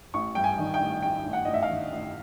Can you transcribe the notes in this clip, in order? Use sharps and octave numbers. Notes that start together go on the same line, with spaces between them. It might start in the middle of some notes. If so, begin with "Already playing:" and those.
A1 C#6
G2 G5
G#5
D#3
G5
A1
A1 G5
A1
F#5
A1 D#5
E5
F5
D#3
A1